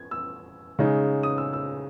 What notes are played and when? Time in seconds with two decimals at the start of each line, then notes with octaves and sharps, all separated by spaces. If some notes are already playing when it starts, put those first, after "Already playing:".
Already playing: G#6
0.11 E6
0.79 C#3 G#3 D#4
1.23 D#6
1.38 E6
1.53 E6